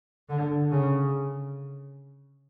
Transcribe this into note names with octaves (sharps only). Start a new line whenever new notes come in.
D3
C#3